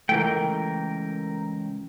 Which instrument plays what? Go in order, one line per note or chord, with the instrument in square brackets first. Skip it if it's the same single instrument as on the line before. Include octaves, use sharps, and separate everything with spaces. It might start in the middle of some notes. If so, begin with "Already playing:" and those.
[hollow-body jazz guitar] C#2 E3 A3 [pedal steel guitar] A#4 G5